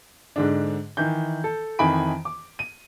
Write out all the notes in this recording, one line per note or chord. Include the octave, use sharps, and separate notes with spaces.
G#2 D3 D4
D#3 E3 G6
A4
F2 D#3 E3 G#5 B5 D7
D6
D#7